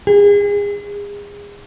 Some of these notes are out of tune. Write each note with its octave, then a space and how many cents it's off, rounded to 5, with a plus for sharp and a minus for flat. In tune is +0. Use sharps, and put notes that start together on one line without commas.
G#4 -30